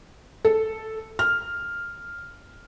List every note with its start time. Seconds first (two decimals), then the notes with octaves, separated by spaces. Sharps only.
0.45 A4
1.19 F6